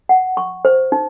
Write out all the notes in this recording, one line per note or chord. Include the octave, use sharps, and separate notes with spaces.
F#5
C#6
C5
D#4